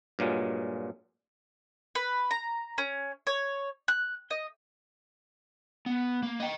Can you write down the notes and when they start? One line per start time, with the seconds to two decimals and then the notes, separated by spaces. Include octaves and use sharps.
0.19 G2 A#2 F#3 G#3
1.95 B4
2.31 A#5
2.78 C#4
3.27 C#5
3.88 F#6
4.31 D#5
5.86 B3
6.23 A#3
6.40 D#5 G5